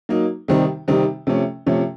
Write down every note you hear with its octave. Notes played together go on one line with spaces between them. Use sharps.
F#3 A#3 D#4
C3 D#3 G3 C4 D#4
C3 D#3 G3 C4 D#4
C3 F3 A3 C#4
C3 F3 A3 C#4